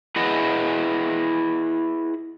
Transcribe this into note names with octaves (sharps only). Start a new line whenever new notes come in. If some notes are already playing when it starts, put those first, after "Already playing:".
E4 G#4 B4 D#5 F#5